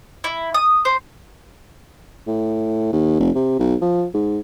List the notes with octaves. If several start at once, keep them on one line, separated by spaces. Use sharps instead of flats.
E4
D#6
C5
A2
D#2
F1
C3
B1
F3
G#2